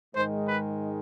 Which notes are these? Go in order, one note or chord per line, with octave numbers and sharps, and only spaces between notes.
G#2 D#3 G#3 C5
B4